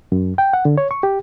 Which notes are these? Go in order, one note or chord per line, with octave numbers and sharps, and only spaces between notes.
F#2
G5
F#5
D3
C#5
C#6
G4